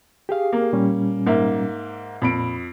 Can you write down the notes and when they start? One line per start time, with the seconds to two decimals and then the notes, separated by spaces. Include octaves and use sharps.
0.29 G4 G#4 F5
0.53 A#3
0.73 A#2 G3 C#4
1.26 G#2 A#3 E5
2.22 F2 A#2 B5 D7